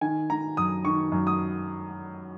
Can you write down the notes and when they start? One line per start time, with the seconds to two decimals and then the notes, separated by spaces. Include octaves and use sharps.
0.01 D#3 G#5
0.30 D#3 A#5
0.57 F#2 D#6
0.85 D#3 C#6
1.12 F#2
1.27 D#6